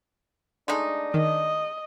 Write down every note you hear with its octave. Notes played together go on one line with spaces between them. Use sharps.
G#3 A3 D4 D#4
D#3 D#5